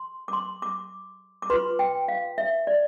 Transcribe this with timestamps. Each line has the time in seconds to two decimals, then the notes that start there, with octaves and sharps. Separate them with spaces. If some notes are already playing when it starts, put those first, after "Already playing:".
Already playing: C6
0.28 D6
0.33 C6
0.62 D6
1.42 D6
1.50 F4 B4 C6
1.79 G5
2.08 F5
2.38 E5
2.67 D5